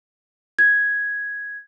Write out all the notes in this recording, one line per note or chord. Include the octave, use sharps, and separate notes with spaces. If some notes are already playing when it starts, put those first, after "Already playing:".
G#6